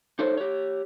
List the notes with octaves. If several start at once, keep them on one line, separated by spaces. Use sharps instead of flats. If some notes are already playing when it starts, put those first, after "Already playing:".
D#4 A4 C5 C#5
G4 C#5